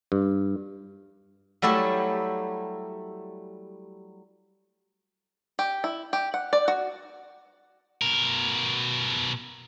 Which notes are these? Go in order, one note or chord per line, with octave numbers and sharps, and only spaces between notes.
G2
F#3 G3 A3 E4 G4
G4
E4
G4
F#5
D5
F#4
B2 A#4